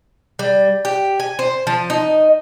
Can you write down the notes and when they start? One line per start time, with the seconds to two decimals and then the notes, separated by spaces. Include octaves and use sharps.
0.39 G3
0.85 G4
1.20 G#5
1.39 C5
1.67 F3
1.90 D#4